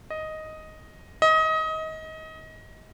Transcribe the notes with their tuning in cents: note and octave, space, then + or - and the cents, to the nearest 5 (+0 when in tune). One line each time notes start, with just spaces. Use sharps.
D#5 +5
D#5 +25